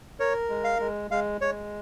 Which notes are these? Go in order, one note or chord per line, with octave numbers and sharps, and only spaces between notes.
A#4 C#5
G#3
F5
G#3
G#3 F5
G#3 C#5